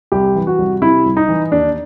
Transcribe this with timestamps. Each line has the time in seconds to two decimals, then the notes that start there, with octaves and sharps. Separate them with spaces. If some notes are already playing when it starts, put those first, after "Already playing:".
0.12 C2 G4
0.36 E3
0.47 F#4
0.58 C2
0.81 C3 E4
1.06 C2
1.17 D#4
1.29 E3
1.52 D#2 D4